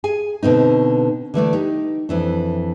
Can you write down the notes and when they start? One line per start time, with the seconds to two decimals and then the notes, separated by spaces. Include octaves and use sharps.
0.04 G#4 G#5
0.43 B2 D3 C4 D#4
1.34 D3 E3 A3 D5
1.53 D#4 G4
2.09 F2 E3 D4